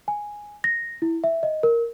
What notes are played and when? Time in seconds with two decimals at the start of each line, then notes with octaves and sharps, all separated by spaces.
0.08 G#5
0.64 A#6
1.02 E4
1.24 E5
1.43 D#5
1.63 A#4